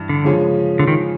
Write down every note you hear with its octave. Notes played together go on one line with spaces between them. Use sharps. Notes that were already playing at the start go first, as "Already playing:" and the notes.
Already playing: G2 E3
D3
C#3 F3 G#3 C#4
D3
D#3